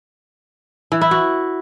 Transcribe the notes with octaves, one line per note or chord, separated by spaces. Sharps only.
E3
E4
F#4